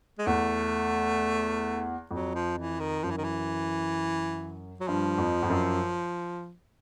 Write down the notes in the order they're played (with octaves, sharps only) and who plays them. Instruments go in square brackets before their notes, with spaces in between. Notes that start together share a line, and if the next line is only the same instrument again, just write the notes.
[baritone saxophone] G#3
[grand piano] E2 [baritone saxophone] A3
[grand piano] F2 [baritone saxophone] F#3
[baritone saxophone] F3
E3
D#3
[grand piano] F#2 [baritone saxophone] F3
[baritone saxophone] E3
D#3
E3
F#3
[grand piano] G2 [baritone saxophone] F3
[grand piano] F2
F2
F#2